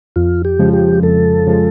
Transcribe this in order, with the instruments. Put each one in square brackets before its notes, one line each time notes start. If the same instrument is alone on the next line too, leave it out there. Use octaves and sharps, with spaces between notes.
[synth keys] F2 [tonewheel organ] F4
[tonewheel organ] G4
[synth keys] C#3 F3 G#3
[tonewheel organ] G4
[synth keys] F2 [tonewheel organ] A4
[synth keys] C#3 F3 G#3